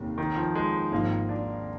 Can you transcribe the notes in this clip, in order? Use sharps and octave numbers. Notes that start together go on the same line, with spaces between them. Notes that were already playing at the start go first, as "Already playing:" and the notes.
Already playing: F1 D#2 A#3
D#3
F3
G#3
G#1 G#2 F3 A#3
D4